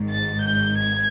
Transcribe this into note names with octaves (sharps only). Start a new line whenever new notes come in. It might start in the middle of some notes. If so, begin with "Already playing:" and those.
Already playing: G#1 G#2 D#3
A6
G6
G#6